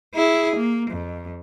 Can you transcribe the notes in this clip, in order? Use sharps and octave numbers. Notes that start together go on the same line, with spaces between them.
E4 G#4
A#3
F2